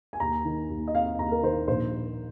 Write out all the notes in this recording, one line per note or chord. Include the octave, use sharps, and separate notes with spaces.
G#5
D#2 A#5
D#3
D#2
D#5
C4 F5
D#2 A#5
A#4
D#3 C5
A#1 C5